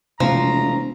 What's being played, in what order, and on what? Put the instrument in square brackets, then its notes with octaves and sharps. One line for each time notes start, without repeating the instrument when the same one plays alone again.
[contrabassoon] E1 [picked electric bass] C3 A3 C#4 [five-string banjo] F3 [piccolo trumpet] A#5